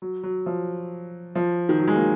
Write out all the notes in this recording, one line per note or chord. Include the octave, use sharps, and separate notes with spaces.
F#3
F#3
F3
F3
D#3
F#3
G#3
A#3